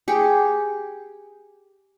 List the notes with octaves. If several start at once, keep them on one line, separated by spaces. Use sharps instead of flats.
G4 G#4